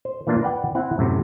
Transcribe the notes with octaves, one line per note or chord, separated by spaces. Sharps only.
C5
E3 A#3 D4 F4
B4 D5 F#5 G5
C4 E4 F#5
F#2 A2 C3